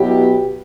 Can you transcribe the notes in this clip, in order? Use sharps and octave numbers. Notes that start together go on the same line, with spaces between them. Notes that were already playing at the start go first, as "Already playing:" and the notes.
Already playing: B2 F#3 B3 E4 G4